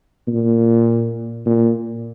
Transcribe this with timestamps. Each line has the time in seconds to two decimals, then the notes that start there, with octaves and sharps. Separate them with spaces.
0.27 A#2
1.46 A#2